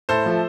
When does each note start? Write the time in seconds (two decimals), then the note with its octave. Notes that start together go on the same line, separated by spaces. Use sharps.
0.09 A2 A4 C5
0.26 F3 A3